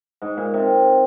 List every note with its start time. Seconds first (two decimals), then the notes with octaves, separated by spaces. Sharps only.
0.22 G#2
0.37 A#2
0.54 C3